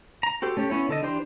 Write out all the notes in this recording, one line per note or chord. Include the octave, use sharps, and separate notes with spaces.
A#5
F#4 G4 A4 C5
A3 C#4 G4
B3 C#4 E4 C#5
D3 A4 D#5
E3 D4 G4 C5 C6